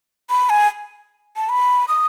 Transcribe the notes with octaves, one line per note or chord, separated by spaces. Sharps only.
B5
G#5
A5
B5
D#6